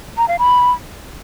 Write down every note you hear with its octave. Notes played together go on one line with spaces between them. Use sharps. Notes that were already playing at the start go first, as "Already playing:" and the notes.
A#5
F5
B5